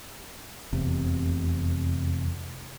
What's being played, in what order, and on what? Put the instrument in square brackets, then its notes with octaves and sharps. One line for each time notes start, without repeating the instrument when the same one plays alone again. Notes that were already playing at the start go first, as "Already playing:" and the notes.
[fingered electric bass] F1 E2 C3